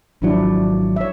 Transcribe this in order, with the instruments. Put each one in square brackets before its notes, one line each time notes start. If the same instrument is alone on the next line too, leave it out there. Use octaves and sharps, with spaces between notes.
[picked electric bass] G#1 F#3 [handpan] F3 D4 E4
[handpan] C#5 E5